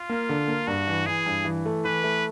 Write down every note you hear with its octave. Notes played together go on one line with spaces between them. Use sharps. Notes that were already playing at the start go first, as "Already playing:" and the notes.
Already playing: F4
A#3
D3
A#3
G2 F#4
E3
E3 G#4
G2
E3
A3
E3 B4
A3